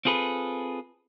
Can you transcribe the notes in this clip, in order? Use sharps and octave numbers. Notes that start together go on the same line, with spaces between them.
C4 F4 G#4 A4 B4